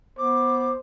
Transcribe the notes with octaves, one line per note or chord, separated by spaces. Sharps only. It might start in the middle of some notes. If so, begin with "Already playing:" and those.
B3 C5 D6